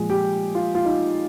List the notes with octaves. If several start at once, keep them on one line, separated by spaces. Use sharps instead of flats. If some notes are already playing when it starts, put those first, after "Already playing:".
Already playing: A#2 F3 G#3 G#4
G4
F4
F4
D#4